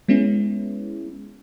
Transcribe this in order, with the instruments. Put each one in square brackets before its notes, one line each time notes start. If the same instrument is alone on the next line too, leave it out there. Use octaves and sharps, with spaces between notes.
[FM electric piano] G#3 B3 C#4 E4